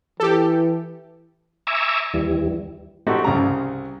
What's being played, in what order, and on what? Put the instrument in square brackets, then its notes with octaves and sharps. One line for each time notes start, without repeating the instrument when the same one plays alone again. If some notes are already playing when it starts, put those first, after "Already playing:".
[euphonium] E3 [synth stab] G4 A4
[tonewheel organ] E5 G#5 A#5 C#6 D6 E6
D#2 E3 G3
[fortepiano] A3 C4 D#4 F#4 G4
C2 C#3 A#5